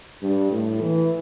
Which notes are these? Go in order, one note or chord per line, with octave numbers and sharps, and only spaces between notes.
G2
A2
E3